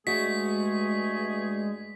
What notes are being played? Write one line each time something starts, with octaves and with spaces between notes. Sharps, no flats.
G2 G#3 A3 F#4 G#4 B6